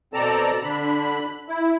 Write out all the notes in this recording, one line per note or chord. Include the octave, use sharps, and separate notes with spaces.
B2 C4 A4 D5 A5 A#5
D3 D4 B5
E4